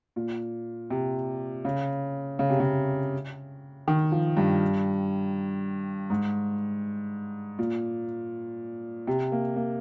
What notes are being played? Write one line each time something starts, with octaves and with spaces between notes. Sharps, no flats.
A#2
C3
C#3
C#3
C3
C#3
D#3
F3
G2
G#2
A#2
C3
A#3
A#3